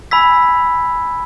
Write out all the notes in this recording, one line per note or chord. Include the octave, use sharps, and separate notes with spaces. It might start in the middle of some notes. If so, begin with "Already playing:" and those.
G#5 B5 E6 G#6 B6